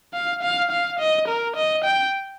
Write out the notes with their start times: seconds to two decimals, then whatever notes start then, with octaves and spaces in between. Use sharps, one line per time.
0.14 F5
0.42 F5
0.71 F5
0.99 D#5
1.28 A#4
1.56 D#5
1.84 G5